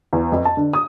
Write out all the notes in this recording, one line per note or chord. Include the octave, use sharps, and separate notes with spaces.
E2
F2
A5
D3
D#6